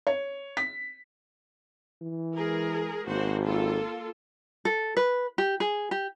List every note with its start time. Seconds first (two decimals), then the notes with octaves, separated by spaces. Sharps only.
0.07 C#5
0.57 B6
2.02 E3
2.35 G#3 G#4 A#4
3.07 G#1 A#3 F#4 C5
3.45 A#3 F4 A4
4.65 A4
4.97 B4
5.38 G4
5.60 G#4
5.91 G4